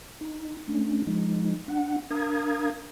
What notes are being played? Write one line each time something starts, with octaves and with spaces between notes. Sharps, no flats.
D#4
A3 C#4 D4
F3 G#3 D#4
D4 F#5
D4 A#4 F5 A#5 D#6 G#6